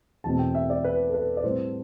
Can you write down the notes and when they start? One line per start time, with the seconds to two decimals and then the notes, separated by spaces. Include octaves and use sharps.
0.24 E2 B2 A3 C4 A5
0.39 G5
0.55 E5
0.70 D5
0.84 B4
1.09 A4
1.14 B4
1.37 D5
1.43 A2 G3 C4 C5